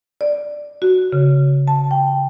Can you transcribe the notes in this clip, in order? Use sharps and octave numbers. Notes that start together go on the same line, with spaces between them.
D5
F#4
C#3
A5
G5